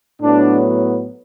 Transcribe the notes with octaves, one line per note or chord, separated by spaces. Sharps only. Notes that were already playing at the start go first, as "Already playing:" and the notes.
A2 F#3 B3 D4